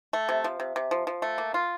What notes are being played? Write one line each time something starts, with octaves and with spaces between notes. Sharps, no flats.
A3
C3
F3
C3
C3
F3
F3
A3
A#3
F4